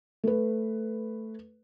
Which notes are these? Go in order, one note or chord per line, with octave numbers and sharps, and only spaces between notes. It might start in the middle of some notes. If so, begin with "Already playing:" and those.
A3 B4